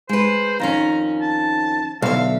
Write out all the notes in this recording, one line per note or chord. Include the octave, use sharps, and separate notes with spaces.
G#3 B4 C5
F2 D#3 C#4 A#5
A5
B1 D3 E5 F5